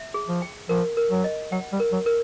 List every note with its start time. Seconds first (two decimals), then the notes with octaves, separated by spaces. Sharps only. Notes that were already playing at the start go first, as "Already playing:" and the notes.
Already playing: E5
0.14 G#4
0.28 F3
0.42 G5
0.69 F3 A#4
0.97 A#4
1.11 F#3
1.24 D#5
1.52 F#3 F#5
1.72 G3
1.80 A#4
1.92 F#3
2.06 A#4